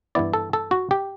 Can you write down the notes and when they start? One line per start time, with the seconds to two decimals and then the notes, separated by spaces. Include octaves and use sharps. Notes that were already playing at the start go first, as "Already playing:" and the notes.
0.15 G2 E3 B3 E4 D5
0.33 A4
0.53 A4
0.71 F#4
0.91 G4